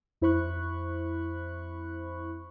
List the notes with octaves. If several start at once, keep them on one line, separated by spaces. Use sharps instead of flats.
F2 E4 C5 B5 C#6 F#6